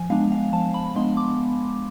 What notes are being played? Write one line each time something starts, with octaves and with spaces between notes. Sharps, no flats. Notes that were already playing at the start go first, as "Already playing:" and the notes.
Already playing: F3 G#5
G#3 B3 D4 F5
F5
F3 A5
B5
G#3 B3 D4 C6
D6